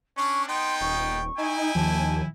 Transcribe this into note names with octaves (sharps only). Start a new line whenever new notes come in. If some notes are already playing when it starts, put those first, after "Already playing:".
C#4 D4 C#6
B3 D#4 G5 C6
D#1 C#6
D#4 E4 G5 G#5
D#2 D#3 F3 A5